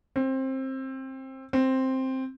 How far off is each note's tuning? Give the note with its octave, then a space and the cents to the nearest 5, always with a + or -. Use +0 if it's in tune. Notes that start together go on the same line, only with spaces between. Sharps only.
C4 +20
C4 +5